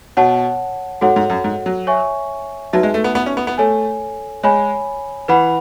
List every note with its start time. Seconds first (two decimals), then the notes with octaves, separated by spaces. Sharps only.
0.17 B2 C#5 F#5 A5
1.01 G#2 F#4 A4 C#5 F#5
1.16 G#2
1.30 F#2
1.44 G#2
1.66 F#3
1.87 C#5 E5 G#5 C#6
2.73 F#3 D#4 F#4 B4 E5 A5
2.83 G#3
2.94 A3
3.04 B3
3.15 B3
3.26 C#4
3.37 B3
3.47 B3
3.58 A3 A4 C#5 G#5
4.43 G#3 C#5 G#5 B5
5.28 E3 B4 F#5 B5